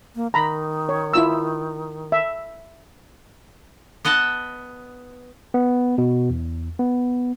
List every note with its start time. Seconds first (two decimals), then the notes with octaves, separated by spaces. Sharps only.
0.16 A#3
0.34 D#3 A#5 B5
0.89 C#5
1.14 E4 F4 E6
2.12 E5
4.05 B3 D#5 F#5 A5
5.54 B3
5.98 B2
6.30 E2
6.79 B3